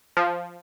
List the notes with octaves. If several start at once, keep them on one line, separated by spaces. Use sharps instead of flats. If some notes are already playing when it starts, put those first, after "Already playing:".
F3